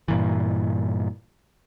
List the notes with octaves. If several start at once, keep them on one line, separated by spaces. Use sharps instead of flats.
G2 A#2 E3